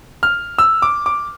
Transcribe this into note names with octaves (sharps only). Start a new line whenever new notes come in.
F6
E6
D6
D6